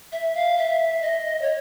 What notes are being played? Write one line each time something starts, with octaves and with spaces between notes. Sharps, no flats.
E5
F5
E5
D#5
C#5